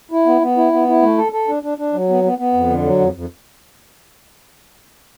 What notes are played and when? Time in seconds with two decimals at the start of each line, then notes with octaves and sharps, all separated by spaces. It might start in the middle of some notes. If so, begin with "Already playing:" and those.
0.11 E4
0.26 B3
0.41 B3
0.57 E4
0.73 B3
0.88 E4
1.02 A3
1.18 A4
1.32 A4
1.48 D4
1.63 D4
1.78 D4
1.93 F#3
2.09 B3
2.24 B3
2.38 B3
2.54 F2
2.69 D3
2.84 F#3
2.99 F2
3.14 F2